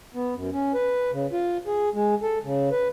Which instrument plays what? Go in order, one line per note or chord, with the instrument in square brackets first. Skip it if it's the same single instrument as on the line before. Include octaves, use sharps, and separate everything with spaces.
[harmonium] B3
F#2
C#4
B4
C#3
F4
G#4
G#3
A4
C#3
B4